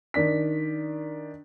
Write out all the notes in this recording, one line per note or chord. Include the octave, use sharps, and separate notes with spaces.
D#3 D4 B6